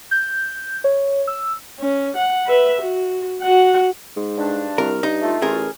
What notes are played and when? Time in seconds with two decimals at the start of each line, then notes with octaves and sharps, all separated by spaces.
0.11 G6
0.84 C#5
1.27 E6
1.79 C#4
2.17 F#5
2.46 B4 E5
2.82 F#4
3.42 F#4 F#5
4.16 G#2
4.37 G2 D4
4.78 C2 A#4
5.03 G2 D#4
5.21 A3 F4
5.42 A1 G#4 A#4